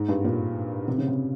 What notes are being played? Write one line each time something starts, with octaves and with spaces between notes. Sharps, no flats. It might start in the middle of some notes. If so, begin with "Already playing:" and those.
Already playing: G#2
G2
A#2
C3
C#3
C3